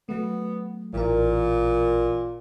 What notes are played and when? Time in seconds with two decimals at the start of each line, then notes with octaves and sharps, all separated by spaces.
0.09 F#3 A3 B3
0.93 A1 A#2 E3 A#4